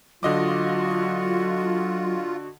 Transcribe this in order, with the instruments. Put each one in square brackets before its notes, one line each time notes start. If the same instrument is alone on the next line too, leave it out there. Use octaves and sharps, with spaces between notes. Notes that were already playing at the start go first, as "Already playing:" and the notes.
[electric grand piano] D3 D#5 D6 [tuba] F#3 [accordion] F4 [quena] F#4